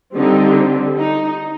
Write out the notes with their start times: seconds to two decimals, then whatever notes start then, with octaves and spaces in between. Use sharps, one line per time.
0.14 D3 G3 C4 D#4
0.98 D#4